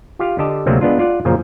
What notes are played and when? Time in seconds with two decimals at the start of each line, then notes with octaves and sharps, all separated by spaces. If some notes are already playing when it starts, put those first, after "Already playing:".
0.19 F4 G4 F5
0.39 D3 G4 D#5 A5
0.67 D2 C3 F#3 G#3 A#3 C4
0.81 G#3 B3 D4 F4
0.99 F4 D5 F#5
1.25 F#2 A#2 C#3 F3